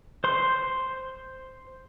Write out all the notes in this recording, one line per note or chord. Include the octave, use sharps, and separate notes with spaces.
C5 C6